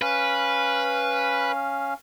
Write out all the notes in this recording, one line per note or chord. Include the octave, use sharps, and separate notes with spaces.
C#4 B4 F5